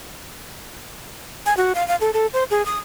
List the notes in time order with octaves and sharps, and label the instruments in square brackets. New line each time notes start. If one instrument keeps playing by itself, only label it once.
[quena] G#5
F#4
F5
F5
A4
A4
C5
G#4
D#6